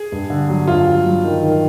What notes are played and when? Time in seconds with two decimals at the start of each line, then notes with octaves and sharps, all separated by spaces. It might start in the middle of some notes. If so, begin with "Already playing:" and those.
Already playing: G#4
0.12 G2
0.30 D3
0.49 F#3
0.68 G2 F4
0.87 F#3
1.06 F#3
1.24 D#3
1.43 D#3